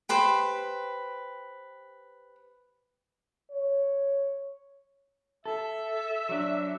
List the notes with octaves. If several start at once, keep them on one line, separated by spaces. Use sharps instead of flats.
G4 B4 C5
C#5
A4 E5
F#3 D4